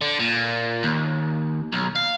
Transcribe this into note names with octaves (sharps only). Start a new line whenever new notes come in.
D3
A#2
D#2
B1
F5